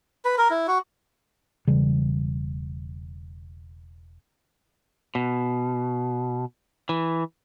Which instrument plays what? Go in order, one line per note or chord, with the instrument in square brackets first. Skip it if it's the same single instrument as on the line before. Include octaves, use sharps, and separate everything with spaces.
[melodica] B4
A#4
E4
F#4
[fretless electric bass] E1 C#3 E3 G3
[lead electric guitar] B2
E3